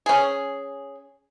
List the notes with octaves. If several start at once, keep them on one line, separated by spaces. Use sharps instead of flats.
C#4 G#4